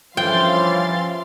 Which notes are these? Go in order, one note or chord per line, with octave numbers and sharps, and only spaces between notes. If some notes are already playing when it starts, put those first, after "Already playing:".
G2 E3 F3 C#4 F5 G5 C6 A6